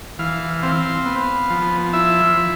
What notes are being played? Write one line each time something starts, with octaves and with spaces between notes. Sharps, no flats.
E3 F5
C4 F5
B3
F3
E4 E5
F3